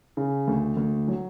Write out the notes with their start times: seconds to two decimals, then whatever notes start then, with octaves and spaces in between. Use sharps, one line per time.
0.17 C#3
0.47 D2
0.77 D2
1.08 F#3